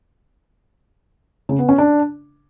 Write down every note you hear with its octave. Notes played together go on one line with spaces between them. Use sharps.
C#3
B3
C#4
D4